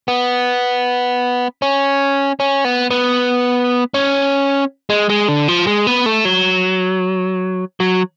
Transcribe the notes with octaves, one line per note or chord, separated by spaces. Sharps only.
B3
C#4
C#4
B3
B3
C#4
G#3
G#3
D3
F3
G#3
B3
A3
F#3
F#3